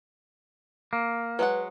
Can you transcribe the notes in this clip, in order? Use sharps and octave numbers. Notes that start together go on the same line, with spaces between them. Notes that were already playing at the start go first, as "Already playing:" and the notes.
A#3
F#3 G#3 B4 F#5